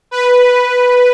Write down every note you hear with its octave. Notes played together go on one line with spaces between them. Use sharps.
B4